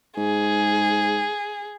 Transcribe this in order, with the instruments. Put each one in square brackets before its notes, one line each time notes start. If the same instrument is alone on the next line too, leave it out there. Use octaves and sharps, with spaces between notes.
[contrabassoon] G#2 [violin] G#4